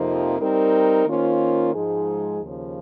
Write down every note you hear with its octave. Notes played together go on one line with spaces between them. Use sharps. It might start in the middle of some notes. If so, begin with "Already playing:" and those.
Already playing: F2 C3 F3 A#3 D#4
G3 C4 D#4 A#4
D#3 A#3 C#4 F4 C5
G#2 F3 G#3 D#4 G#4
D#2 C#3 F3